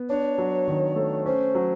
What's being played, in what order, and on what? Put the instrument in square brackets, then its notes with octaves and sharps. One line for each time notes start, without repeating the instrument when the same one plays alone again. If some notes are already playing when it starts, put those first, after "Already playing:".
Already playing: [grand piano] B3
[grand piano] D4 [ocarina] C#5
[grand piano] F#3
D#3
A3
[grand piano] C#4 [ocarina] C5
[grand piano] F#3